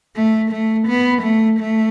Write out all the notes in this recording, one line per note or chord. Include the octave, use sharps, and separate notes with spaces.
A3
A3
B3
A3
A3